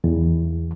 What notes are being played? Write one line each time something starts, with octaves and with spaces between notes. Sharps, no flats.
E2